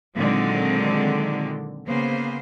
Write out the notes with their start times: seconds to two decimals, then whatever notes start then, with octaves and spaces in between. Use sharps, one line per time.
0.16 A#2 D3 D#3 F#3 G#3 C4
1.87 C#3 A#3 B3 C5